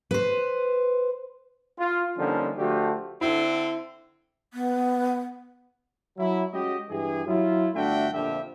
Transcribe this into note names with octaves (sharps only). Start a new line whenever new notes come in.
B4 C5
F4
D3 F3 G3 A#3 C#4 D#4
D3 F3 A3 F#4 G4
D3 C4 E4
B3
F#3 E4
G#3 C#4 F#4 G4 D#5
G2 E3 G4 G#4
F#3 E4 F4
G1 A3 D4 F#4 E5 G5
A#1 F2 D3 F3 G4 E5